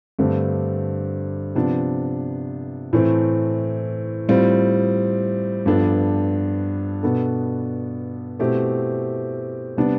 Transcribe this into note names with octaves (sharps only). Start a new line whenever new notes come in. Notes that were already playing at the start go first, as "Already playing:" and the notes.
G2 D3 A3 C4 G4
C3 F3 B3 D4
A2 E3 A3 C4
A2 G3 C4 F4
G2 F3 B3 D4 A4
B2 B3 D4 A4
B2 A3 C4 E4 G4
C3 G3 B3 D4